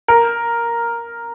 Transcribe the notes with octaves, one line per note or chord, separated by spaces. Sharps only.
A#4